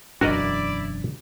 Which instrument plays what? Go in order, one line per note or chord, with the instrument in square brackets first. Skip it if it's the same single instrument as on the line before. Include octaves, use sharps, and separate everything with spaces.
[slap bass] E1 F#2 D4 [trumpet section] E4 D5 [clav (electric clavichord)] F#4 A#4 D#5